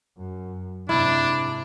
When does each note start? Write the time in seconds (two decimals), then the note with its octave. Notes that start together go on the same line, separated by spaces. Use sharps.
0.17 F#2
0.89 G#2 C3 D4 E4